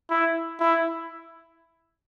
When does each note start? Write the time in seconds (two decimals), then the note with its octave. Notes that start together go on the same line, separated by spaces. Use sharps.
0.11 E4
0.60 E4